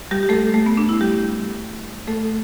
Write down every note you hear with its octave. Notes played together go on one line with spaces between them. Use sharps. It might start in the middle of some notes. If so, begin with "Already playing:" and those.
G3 G4
G4
A3 A4
A3
B3
D4
E4
G3 G4
A3 A4